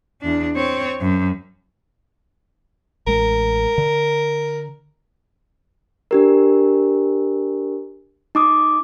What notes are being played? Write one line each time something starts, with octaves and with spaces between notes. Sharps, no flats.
E2 D4
C4 C#5
F#2
A1 G#3 A#4
D3
D4 G4 A#4
D#4 D6 D#6